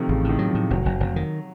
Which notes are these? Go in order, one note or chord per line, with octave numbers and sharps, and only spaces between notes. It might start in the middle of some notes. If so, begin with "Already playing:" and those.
Already playing: C3 D#3 F3 A3
A1 C#3
A2 D#3
F#3
F3
A2
F1 F#3
F1
F1
D#3